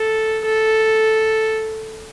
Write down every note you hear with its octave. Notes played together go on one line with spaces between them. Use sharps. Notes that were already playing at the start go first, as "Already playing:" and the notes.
Already playing: A4
A4